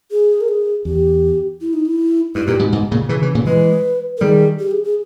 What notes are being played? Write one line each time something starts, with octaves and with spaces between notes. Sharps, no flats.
G#4
A#4
G#4
E2 G4
E4
D#4
E4
G2 E4
G2 A#2 G4
G#2 B2
G#2 B2
A#2 C#3
C#3 E3
C#3 E3
A#2 C#3
E3 G#3 B4
A#4
D#3 G3 G#4
G4
G#4
G#4